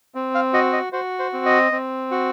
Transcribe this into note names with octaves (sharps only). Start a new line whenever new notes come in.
C4
F5
F#4 D#5
D#5
F#4 C5
C5
C4
D#5
C4
F#4